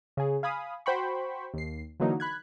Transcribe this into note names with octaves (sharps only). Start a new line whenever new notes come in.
C#3 G#4
F5 G#5 B5 D#6
F#4 C5 G5 B5 C#6
D#2 C7
D3 E3 F#3 A#3 D#4
B5 F#6 G#6